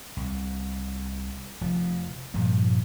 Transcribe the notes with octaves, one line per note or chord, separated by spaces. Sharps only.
C2
F1 F3
G2 A#2 F3 G3